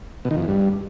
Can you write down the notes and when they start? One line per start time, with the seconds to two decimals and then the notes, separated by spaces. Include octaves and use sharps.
0.25 B2
0.31 D#3
0.37 F2
0.42 E2
0.48 G2